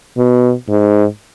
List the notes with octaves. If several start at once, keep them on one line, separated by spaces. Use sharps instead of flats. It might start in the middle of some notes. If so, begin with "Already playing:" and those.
B2
G#2